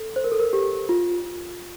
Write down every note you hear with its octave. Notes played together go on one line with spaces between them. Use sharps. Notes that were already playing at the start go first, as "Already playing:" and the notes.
Already playing: A4
C5
A#4
A4
A#4
G4
F4